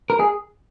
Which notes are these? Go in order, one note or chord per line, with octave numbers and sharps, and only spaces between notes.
A#4
G#4